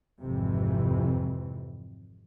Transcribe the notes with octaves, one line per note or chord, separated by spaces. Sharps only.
G#1 F2 C3 E3